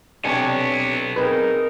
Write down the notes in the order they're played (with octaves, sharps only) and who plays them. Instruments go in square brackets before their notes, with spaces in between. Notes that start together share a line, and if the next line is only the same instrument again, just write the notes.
[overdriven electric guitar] B1 B3 [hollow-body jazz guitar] C3 G#5 [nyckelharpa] D4 C#5
[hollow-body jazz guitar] C4 G#4 B4 [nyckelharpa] D#4 A#4